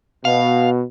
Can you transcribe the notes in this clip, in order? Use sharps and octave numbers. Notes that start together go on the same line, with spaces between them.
B2 F5